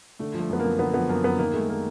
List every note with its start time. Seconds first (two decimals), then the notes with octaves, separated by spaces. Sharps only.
0.19 D3 A3
0.34 F3 A3
0.49 F#2 B3
0.59 A#3
0.65 F#2
0.79 D3 B3
0.94 F3 B3
1.09 F#2 A#3
1.24 F#2 B3
1.39 D#3 A#3
1.54 G#3 A3
1.69 A#3